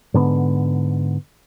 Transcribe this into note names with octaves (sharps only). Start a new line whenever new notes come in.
G#2 D3 B3